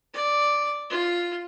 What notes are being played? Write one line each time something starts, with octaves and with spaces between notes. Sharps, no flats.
D5
F4